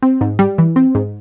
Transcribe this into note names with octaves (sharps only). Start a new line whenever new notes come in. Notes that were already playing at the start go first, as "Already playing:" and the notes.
C4
G#2
G3
E3
C4
G#2